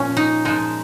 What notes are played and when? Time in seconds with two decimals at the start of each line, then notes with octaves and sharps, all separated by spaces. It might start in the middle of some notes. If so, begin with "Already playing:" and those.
Already playing: A#2 F3 C#4
0.17 D#4
0.45 A#2 F3 G#3 D#4